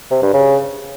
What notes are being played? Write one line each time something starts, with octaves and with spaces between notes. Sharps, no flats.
C3
G2
C#3